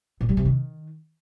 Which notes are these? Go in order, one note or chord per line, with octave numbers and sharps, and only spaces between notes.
A#2
G3
C3
D#3